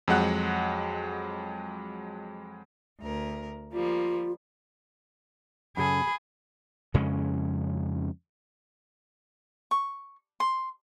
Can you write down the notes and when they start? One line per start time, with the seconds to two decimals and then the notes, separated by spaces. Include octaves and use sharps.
0.08 F2 F#3 G#3 F#5 F#6
3.01 D2 A#4
3.73 F3 G3 A#3 F4
5.77 F#2 C#3 G#4 A4 B5
6.94 F2 C#3 G#3 C#4
9.71 C#6
10.40 C6